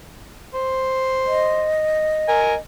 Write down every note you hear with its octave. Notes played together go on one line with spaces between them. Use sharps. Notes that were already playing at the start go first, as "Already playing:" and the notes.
C5
D#5
A#4 G#5